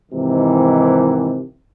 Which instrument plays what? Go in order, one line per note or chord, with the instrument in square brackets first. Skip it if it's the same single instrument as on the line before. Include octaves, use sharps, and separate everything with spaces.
[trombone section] G#2 C3 D#3 E3